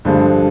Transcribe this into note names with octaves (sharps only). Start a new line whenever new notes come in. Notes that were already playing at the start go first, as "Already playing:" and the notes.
G2 D3 F3 G#3